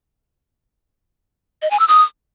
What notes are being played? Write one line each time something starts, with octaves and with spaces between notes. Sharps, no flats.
D#5
G#5
E6
D#6